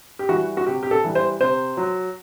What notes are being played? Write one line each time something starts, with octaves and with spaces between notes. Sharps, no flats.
G4
E3 G3 F#4
F#4
C3 G4
G4
A4
E3 G3
C5
C3 C5
F#3